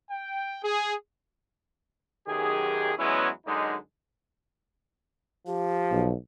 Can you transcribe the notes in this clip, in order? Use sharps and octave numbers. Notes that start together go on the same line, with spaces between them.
G5
G#4
B1 F#2 D#3 G4 G#4
E2 F#3 G#3 B3 C#4 E4
F#2 D3 G#3 D#4
F3 G4
B1